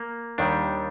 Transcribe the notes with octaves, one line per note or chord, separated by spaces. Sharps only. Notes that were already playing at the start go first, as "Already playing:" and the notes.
Already playing: A#3
D#2 D#3 G3 D4